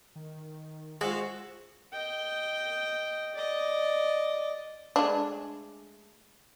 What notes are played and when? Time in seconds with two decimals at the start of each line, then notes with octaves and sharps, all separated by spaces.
0.16 D#3
1.01 G#3 F4 F#4 C5 E5
1.92 D#5 G5
3.35 D5 D#5
4.96 G#3 A3 D4